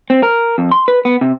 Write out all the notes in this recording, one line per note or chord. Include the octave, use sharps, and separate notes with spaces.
C4
A#4
F2
C6
B4
B3
C3